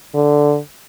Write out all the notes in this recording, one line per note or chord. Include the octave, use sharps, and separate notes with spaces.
D3